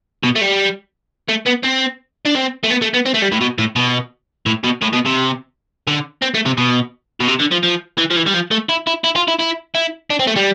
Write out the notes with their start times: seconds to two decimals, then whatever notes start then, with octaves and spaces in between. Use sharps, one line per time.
0.23 B2
0.35 A3
0.41 G3
1.29 A3
1.47 B3
1.64 C4
2.26 D4
2.35 C4
2.64 A3
2.70 B3
2.82 A3
2.94 B3
3.06 C4
3.15 A3
3.22 G3
3.32 A2
3.41 B2
3.58 A2
3.76 B2
4.46 A2
4.64 B2
4.82 A2
4.93 B2
5.06 C3
5.87 D3
6.22 C4
6.34 A3
6.46 C3
6.58 B2
7.20 B2
7.28 C3
7.40 D3
7.52 F3
7.63 F3
7.98 E3
8.11 F3
8.17 E3
8.27 G3
8.34 F3
8.51 A3
8.69 E4
8.87 E4
9.04 E4
9.16 F4
9.28 E4
9.40 E4
9.75 E4
10.10 D4
10.19 C4
10.27 A3
10.36 G3